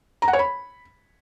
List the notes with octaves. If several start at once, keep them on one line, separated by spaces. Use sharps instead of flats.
A#5
F#5
C#5
B5